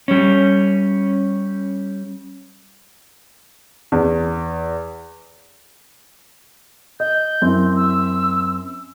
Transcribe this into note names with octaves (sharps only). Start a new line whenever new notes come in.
G3 C#4
E2
D#5 G6
F#2 C4 E4
E6